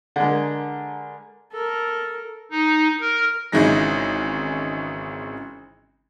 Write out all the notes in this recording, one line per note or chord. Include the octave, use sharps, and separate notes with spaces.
D3 G#3 A#4 G#5 B5
A4 A#4
D#4
A#4
G#1 C#3 E3 G#3 D#4 A#6